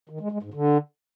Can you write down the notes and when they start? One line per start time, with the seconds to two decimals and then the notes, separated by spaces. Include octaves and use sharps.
0.09 D#3
0.20 G#3
0.32 G#3
0.43 G#2
0.54 D3